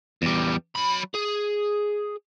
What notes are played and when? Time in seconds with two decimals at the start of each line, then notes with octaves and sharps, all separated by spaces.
0.22 E2 G3
0.75 F#3 B5
1.14 G#4